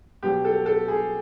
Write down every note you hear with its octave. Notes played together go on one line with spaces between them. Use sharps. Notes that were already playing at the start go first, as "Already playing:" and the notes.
B2 F#3 G4
A4
A4
G#4